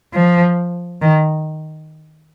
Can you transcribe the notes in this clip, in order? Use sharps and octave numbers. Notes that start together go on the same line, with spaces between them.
F3
D#3